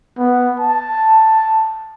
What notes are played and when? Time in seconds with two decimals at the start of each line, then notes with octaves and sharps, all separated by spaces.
0.18 B3
0.60 A5